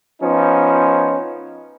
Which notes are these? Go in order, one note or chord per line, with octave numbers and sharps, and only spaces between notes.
F3 B3 C#4 D#4